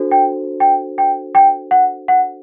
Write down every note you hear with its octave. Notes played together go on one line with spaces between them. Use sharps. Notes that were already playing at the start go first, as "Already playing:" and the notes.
Already playing: D4 F#4 A4 C5
G5
G5
G5
G5
F#5
F#5